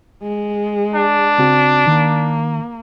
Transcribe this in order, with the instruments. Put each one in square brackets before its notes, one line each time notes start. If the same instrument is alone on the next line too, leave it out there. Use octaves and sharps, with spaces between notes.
[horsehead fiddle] G#3
[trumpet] D4
[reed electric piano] C#3 C4 F#4
[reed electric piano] D#3 [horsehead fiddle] A#3